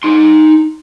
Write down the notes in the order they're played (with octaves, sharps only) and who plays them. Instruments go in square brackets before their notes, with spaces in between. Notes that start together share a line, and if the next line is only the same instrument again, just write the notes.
[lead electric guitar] D#4 C6